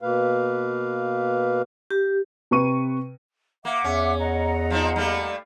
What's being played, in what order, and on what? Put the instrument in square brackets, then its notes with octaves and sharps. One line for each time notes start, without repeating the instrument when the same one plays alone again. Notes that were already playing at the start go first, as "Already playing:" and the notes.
[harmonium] B2 A#3 B4 F5
[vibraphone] G4
[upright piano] C3 B4 C#6 D#7
[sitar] A#3 [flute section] E5 F#5 D6
[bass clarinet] E2 [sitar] C#4
[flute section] D#5 F#5 A#5
[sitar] F3 C4 D#4
G3 A3 A#3